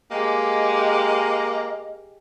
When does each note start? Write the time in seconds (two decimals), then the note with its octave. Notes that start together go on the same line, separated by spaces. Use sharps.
0.11 G#3 A#3 G4 D#5